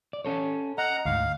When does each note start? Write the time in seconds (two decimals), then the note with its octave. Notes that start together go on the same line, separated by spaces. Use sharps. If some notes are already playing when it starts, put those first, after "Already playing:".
0.13 D5
0.25 C#4 A4 C#5
0.78 D#5 F#5 A#5 F6
1.06 D2 G#2 F5 F6